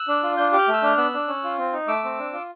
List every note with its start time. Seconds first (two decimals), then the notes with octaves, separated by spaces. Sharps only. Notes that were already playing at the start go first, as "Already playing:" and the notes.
Already playing: E6 F#6
0.08 D4
0.23 F4
0.37 D4 G6
0.52 G4
0.58 F6 G6
0.68 A3
0.74 E6
0.82 D4 F6
0.98 B3 E6 F#6
1.13 D4
1.28 C#4
1.44 F4
1.58 C4
1.73 D#4
1.88 A3 D6 E6
2.04 C4
2.19 D4
2.33 F4